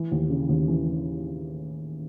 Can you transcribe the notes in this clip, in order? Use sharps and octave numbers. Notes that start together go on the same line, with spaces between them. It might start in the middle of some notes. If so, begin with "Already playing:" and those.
Already playing: E3
D#2
C#3
D#2
E3